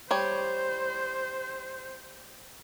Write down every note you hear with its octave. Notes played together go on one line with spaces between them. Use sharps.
G3 C5 C#5